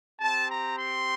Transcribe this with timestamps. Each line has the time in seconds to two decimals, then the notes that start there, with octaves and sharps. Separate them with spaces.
0.20 C4 G4 A5
0.49 A#5
0.77 C6